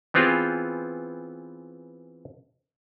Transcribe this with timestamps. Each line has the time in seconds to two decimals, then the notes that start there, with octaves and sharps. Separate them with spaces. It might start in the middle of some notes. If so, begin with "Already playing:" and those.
0.14 E3 B3 C4 F4 G4 G#4